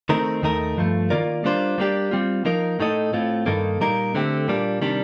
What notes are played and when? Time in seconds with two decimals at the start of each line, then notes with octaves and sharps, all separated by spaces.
0.09 D#3 A3 C4 D#4 A#4
0.42 D#2 D#3 A3 D#4 A#4
0.77 G2 F3 A3
1.10 D#3 A#3 F4 A#4 D5
1.44 G3 A#3 D4 F4 C5
1.78 G3 A#3 D4 G4 D5
2.11 G3 C4 F4
2.45 F3 A#3 D#4 A#4
2.80 A2 A3 D#4 A4 D#5
3.13 A2 A3 C4 F4
3.46 G2 D#3 A#3 D#4 A4
3.80 A#2 G3 A#3 D#4 A#4
4.15 D3 A3 C4 G4
4.48 A#2 G3 A#3 D4
4.82 C3 D#3 G3 D4